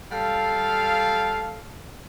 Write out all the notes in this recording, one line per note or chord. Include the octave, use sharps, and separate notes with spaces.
G3 A4 F5